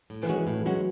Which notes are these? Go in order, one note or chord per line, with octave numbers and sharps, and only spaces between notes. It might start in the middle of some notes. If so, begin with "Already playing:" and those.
A2
E3
G#3 C#4 F#4
E3
A2 E3
F#3 G#3 C#4 F#4